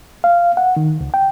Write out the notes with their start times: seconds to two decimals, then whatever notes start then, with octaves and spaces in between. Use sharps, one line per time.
0.24 F5
0.57 F#5
0.77 D#3
1.01 C#2
1.14 G5